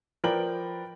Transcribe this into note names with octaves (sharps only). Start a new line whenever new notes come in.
F3 A#4 B4 D5 G5 F#7